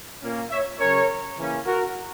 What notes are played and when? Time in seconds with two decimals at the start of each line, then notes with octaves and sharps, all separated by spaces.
0.22 A#2 A#3 C#4
0.50 C#5 E5
0.79 C#3 F#3 C#4 A#4 C#5
1.37 C#3 E3 A#3 C#4
1.66 F#4 A#4